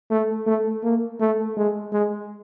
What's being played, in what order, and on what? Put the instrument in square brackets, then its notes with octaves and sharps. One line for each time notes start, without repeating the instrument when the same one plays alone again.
[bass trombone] A3
A3
A#3
A3
G#3
G#3